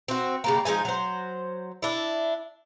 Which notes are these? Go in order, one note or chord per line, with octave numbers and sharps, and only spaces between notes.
C4 F#4
C#3 G3 A#3
F3 G#3 D#4 G#5
F#3 C5
D4 E4